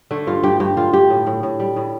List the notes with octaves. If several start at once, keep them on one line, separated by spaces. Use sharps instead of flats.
D3 A3
G2 F4
G2 G4
G2 G4
D3 F4
G2 G4
A2
A2
A2
G3
A2